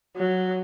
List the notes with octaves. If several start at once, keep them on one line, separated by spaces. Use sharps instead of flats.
F#3